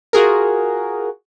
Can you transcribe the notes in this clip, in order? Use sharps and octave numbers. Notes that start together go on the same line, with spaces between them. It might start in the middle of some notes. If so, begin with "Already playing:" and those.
F4 F#4 G#4 A#4